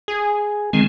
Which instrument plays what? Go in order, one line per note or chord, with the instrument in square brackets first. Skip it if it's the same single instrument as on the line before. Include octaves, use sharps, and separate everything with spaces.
[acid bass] G#4
[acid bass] D#3 [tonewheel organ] G#3 C4